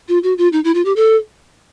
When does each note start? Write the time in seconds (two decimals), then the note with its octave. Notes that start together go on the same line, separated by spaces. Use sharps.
0.08 F4
0.23 F#4
0.38 F4
0.53 D#4
0.64 E4
0.75 F4
0.85 G4
0.96 A4